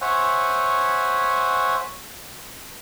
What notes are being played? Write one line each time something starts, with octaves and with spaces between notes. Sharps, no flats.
C5 C#5 E5 F#5 G#5